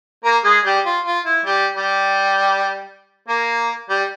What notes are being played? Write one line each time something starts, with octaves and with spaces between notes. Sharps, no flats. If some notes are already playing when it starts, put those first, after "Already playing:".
A#3 A#4
G#3 G#4
G3 G4
F4
F4
E4
G3 G4
G3 G4
A#3 A#4
G3 G4